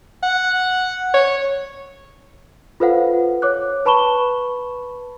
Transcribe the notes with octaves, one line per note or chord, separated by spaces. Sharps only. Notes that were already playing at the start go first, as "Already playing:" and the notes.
F#5
C#5
F4 A4 B4 C5 F5 F#5
C#5 D6 F#6
B4 A5 B5 C#6 E7 G7